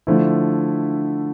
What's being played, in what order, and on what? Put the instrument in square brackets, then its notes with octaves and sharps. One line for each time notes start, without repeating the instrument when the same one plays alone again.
[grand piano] D3 F3 A3 E4